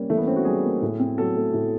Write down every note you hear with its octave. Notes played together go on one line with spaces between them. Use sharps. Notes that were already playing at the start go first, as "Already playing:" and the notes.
Already playing: G3 A#3 C#4
E3 A3
B3
C4 C#4
F#4
G3 G#4
A#3
A2
C4
F#3 A4
A3
A2